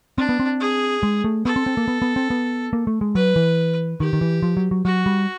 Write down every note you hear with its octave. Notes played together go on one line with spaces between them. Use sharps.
C4 D4
B3
C4
G#4
G#3
A3
B3 A4
C4
C4
A#3
B3
B3
C4
B3
A#3
A3
G#3
F#3 B4
E3
D#3 G4
D#3
E3
F3
F#3
F#3
F#3 F#4
G3